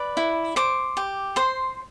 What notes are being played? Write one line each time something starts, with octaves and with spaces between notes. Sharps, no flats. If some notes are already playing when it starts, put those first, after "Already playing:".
Already playing: B4 D5 D6
E4
C5 D6
G4
C5 C6